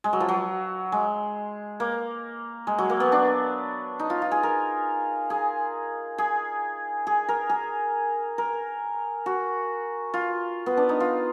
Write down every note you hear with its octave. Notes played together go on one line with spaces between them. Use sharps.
G#3
F#3
F3
F#3
G#3
A#3
G#3
F#3
A#3
B3
D4
D#4
F4
F4
G#4
A#4
G#4
G#4
G#4
A#4
G#4
A#4
F#4
F4
B3
D4
D#4
F4